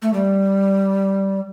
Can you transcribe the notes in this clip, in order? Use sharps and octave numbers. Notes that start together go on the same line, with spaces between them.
A3
G3